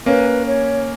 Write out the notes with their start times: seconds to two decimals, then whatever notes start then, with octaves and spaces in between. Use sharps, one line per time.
0.06 A#3 C#4 B4
0.46 C#5